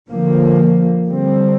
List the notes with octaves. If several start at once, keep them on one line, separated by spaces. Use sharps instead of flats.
D3 F3 A#3
D3 G3 C4